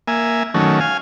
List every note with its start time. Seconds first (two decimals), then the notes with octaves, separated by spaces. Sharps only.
0.08 A#3 E5 G#5
0.54 D#3 F#3 A3 C#4
0.81 F5 G#5